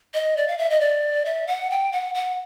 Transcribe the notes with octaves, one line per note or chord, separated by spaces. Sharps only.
D#5
D5
F5
E5
D#5
D5
E5
F#5
G5
F#5
F#5